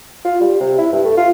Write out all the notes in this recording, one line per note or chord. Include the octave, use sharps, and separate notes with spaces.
F4
G3
C3
E4
G2
A3
F4